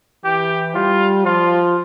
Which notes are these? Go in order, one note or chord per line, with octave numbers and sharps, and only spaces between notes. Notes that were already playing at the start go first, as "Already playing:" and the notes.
E3 G4
G3 F4
F3 F4